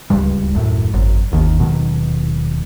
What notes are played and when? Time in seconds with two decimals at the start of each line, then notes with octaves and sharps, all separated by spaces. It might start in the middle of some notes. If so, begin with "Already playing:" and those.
0.10 D1 C#2 G2 G3
0.54 D#1 F#2 A2
0.93 G#1 F#2
1.31 G1 D#2 D#3
1.59 D#1 B2 D#3 F#3